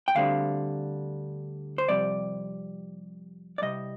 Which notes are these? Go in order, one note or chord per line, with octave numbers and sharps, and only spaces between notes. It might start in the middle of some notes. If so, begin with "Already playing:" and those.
G5
D2 D3 G3 C4 F5
C5
F2 C3 G3 C4 D5
D5
C2 C3 G3 D#5